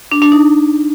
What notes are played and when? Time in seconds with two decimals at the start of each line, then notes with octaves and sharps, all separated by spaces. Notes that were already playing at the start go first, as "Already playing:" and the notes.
0.12 D4
0.22 D4
0.32 D#4